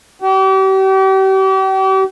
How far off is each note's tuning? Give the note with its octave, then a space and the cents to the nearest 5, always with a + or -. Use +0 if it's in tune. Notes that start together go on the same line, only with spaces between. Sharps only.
G4 -40